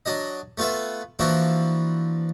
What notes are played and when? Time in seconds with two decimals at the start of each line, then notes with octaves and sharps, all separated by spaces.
0.06 F#3 D4 D#5
0.58 A3 B3 F4 B4 E5
1.19 E3 F3 A#3 D4 E4 F#4